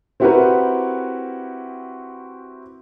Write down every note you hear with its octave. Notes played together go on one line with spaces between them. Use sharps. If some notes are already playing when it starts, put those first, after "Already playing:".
C4 E4 F#4 G4 A#4 B4